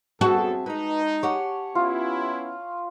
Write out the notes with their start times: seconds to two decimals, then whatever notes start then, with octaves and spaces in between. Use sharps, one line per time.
0.21 F#2 B3 C4 F#4 G#4 A4 E5 A5
0.66 G#3 D#4 B4 A#5
1.23 G4 C#5 F#5 G#5
1.75 B3 C#4 E4 F4